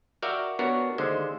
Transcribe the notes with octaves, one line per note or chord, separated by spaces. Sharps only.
F#4 A#4 D5 E5 F5 G5
B3 D4 F#4 A#4 C#5
D#2 D3 G#3 C5